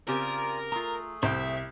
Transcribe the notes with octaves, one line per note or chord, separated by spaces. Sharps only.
C#3 C4 F4 G4 A#4 D5 G#5
A3 F4 G#4 A#5
C2 C5 E5 G5